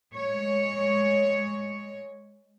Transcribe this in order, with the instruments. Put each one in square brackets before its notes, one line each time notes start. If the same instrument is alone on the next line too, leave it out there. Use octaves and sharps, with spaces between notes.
[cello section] G#3 C#5